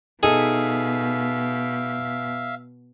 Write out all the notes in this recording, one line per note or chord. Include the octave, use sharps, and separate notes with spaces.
B2 D#4 G#4 A4 E5 F5